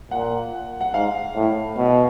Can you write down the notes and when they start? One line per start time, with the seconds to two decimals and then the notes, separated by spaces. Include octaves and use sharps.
0.11 A#2 F#5
0.81 F#5
0.93 G#2 F5
1.36 A2
1.77 B2